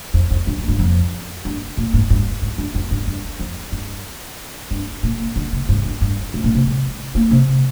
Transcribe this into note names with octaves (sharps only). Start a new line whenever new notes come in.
F2
F2
G2
G#2
G2
F2
G2
A#2
G#2
G2
G#2
G2
F2
G2
G2
F2
G2
G2
A#2
D3
C3
G2
G2
G2
G#2
A#2
C3
G#3
A#3
C3